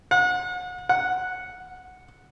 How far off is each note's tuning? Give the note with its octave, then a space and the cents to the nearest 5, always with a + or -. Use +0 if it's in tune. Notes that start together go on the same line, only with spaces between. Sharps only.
F#5 -35
F#5 -5